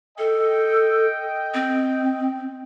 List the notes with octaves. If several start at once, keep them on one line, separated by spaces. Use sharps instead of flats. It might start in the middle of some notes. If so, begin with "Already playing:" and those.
A4 D#5 G5
C4